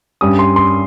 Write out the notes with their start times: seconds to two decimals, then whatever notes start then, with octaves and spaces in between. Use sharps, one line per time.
0.21 G2 G3 C#4 D#6
0.39 C6
0.56 C6